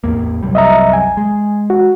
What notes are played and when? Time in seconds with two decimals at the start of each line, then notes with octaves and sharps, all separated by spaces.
0.04 A1 E2 A#3
0.43 C2 F#2 G3
0.55 D#5 E5 A#5
0.93 G#5
1.17 G#3
1.70 F#4